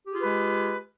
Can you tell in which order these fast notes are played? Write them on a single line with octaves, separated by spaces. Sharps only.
G4 G#4 F4 B4 G#3